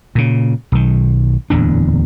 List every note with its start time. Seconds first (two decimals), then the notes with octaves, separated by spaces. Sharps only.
0.15 A#2 C#3
0.72 B1 D#3
1.50 D1 E2 A#2 D4